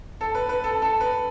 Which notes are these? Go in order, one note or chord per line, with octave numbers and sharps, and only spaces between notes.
A4
B4
B4
A4
A4
B4